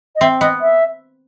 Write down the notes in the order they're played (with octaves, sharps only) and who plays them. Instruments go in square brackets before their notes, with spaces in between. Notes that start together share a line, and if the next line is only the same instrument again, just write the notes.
[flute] D#5
[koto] C4 [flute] E5
[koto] B3 [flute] D#5
[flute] E5